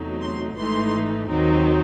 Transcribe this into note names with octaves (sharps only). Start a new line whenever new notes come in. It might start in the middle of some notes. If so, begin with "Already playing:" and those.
Already playing: E2 C3 F#3 A3 D#4
C6
G#1 G#2 E3 A3 D#4 C6
D#2 D#3 F#3 C4 D#4